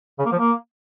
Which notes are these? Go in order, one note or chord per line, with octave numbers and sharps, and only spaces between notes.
C#3
A#3
F3
A#3